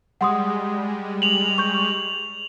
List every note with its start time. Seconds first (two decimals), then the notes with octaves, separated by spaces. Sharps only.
0.21 G3 G#3 F#5 C6 D#6
1.22 F7 F#7
1.58 C#6 G6